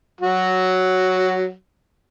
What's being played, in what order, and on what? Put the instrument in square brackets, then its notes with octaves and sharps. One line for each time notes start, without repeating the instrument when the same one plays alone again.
[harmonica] F#3 F#4